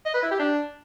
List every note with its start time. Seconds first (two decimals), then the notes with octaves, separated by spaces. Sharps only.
0.06 D#5
0.14 B4
0.23 E4
0.31 G4
0.39 D4